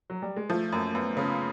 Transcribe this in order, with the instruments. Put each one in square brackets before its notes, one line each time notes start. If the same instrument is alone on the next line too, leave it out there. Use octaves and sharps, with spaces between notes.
[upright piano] F#3
G3
G#3
[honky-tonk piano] F3 [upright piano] A3
[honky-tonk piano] F#2 [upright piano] A#3
[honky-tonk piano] F#2 [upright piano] B3
[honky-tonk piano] C#3 [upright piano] C#4